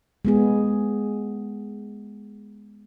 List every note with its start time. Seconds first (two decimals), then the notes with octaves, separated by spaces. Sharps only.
0.25 G#3 B3 G#4